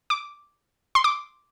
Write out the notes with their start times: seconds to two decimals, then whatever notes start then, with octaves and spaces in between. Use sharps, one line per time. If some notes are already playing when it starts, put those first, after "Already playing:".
0.10 D6
0.95 C6
1.04 D6